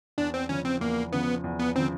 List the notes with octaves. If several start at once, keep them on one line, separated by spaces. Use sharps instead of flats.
E2 D4
C4
C#3 F3 C#4
C4
E2 A#3
C#3 F3 B3
E2
B3
C#3 F3 C4